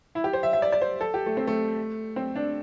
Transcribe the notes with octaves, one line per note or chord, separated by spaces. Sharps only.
E4
G4
C5
E5
E5
D5
D5
C5
A4
G4
A3
C4
A3
C4
D4